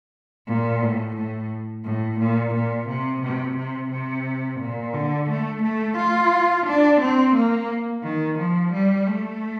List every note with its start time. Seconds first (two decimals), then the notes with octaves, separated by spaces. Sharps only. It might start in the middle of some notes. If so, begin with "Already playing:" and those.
0.47 A#2
0.81 A2
1.16 A2
1.84 A2
2.19 A#2
2.54 A#2
2.89 C3
3.22 C3
3.57 C3
3.92 C3
4.60 A#2
4.94 D3
5.29 A3
5.63 A3
5.98 F4
6.66 D4
7.01 C4
7.36 A#3
8.03 D#3
8.39 F3
8.73 G3
9.07 A3